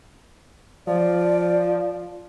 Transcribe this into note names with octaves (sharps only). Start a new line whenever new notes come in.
F3 D5